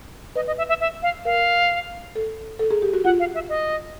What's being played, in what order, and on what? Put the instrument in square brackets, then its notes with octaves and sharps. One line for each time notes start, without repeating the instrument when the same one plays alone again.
[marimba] B4 [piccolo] D#5
[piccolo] D#5
E5
E5
E5
F5
[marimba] A#4 [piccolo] F5
[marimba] A4
A4
G#4
G4
F#4
[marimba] F4 [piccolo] F#5
[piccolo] F5
E5
D#5